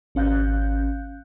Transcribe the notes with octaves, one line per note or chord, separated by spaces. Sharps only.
G#1 C#4 F5 F#6 G6